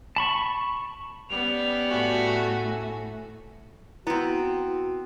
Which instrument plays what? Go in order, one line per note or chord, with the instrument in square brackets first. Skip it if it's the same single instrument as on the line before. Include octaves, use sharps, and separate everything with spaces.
[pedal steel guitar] A5 B5 C#6
[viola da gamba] G3 B3 C#4 [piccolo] F7
[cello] A2 [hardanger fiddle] A3 F#4 [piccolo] G#5
[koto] B3 C4 [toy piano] E4 [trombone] F#4